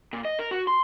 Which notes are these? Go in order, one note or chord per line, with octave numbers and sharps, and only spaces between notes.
A#2
D#5
A#4
F#4
C6